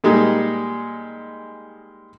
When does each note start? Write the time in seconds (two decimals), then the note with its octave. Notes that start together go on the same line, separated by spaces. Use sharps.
0.04 A#2 G3 G#3 D#4